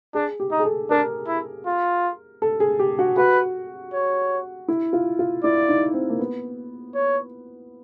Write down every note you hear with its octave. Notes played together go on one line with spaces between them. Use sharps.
D4 G#4
G4
D#4
G#4
A4
D4 A#4
E4
F4
A4
G#4
G4
F#4
F#4 B4
C#5
E4
F4
F4
E4 D5
D#4
C4
A#3
B3
C#5